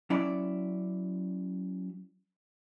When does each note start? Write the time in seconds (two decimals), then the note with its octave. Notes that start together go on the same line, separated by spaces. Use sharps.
0.10 F#3 C#4 E4 D5